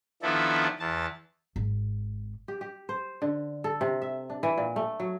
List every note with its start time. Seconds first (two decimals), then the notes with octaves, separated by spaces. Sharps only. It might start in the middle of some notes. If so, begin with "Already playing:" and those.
0.22 D#3 F3 B3 D4 E4 A4
0.79 E2 A5
1.56 G#1
2.48 G4
2.61 G4
2.89 C5
3.22 D3
3.64 A4
3.81 C3
4.02 E5
4.30 D4
4.43 E3
4.58 A#2
4.76 A3
5.00 F#3